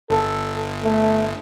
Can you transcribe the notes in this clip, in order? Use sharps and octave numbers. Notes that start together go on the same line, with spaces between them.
G1 A4
A3